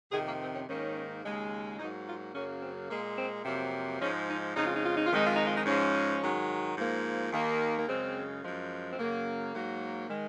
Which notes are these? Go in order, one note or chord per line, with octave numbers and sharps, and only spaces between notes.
F2 C3 D#3 G#4
A#3
C4
C#4
G#2 D#3 A#3 C#4
D#2 C#3 G#3
G#2 F#3 A#3 D#4
F4
F#2 C#3 F#3 A#3 C#4
C4
A#2 G#3 A#3
C4
F2 C3 F#3 A#3 C4
G#2 F3 G#3 C#4
D#4
F2 C#3 G#3 D#4
F4
D#4
F4
D#4
F4
F2 D#3 G#3 D#4
F4
D#4
F4
D#4
G#2 F3 G#3 C#4
G#2 D#3 F#3
G#2 F3 A#3
D#2 D#3 A#3
A#3
F#2 C#3 G#3 C4
F#2 F3 G#3
C4
F#2 C#3 F#3 A#3
G#2 F#3 A#3
D#3 G#3